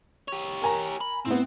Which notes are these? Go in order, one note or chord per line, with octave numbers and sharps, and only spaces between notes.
G4 C#5
A#4 G#5 A#5
B5
A2 B3 C4